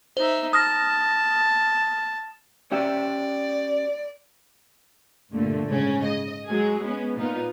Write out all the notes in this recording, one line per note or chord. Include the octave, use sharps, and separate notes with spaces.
D#4 C5 E5
A5 D#6 F6 A#6
C#4 G4 D5 E5
G2 A#2 D3 A3
G#2 C#3 C#4
D#5
F#3 G#3 G#4
G#3 B3 C#4
A#2 B3 D#4 F4